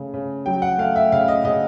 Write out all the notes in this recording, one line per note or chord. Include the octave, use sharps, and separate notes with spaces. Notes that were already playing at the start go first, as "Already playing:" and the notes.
Already playing: C#3 A3
C#3
F#3 G5
F#5
A3 F5
E5
C#3 F5
D#5
C#3 D#5